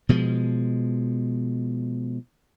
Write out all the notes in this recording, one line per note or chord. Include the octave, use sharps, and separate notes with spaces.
B2 F3 G#3